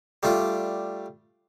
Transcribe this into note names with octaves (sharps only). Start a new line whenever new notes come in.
G3 A3 D4 F4